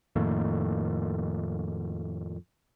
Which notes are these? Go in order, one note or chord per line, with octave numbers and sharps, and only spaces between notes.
F2 A2 D#3 A#3